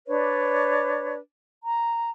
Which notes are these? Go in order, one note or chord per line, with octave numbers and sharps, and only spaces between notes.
D4 B4 C#5 D5
A#5